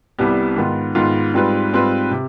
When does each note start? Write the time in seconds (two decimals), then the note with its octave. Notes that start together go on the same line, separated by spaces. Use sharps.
0.19 C2 C3 G3 B3
0.56 G#2 D#3 B3 F4
0.95 G#2 D#3 B3 F4
1.34 G#2 G3 C4 F4 B4
1.72 G#2 G3 C4 F4 B4
2.11 C3